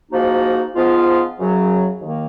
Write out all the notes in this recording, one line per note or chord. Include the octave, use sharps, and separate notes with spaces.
G#2 F3 A#3 D#4 F#4
G#2 F3 B3 F4
F#2 C#3 F#3
D#2 D#3 A#3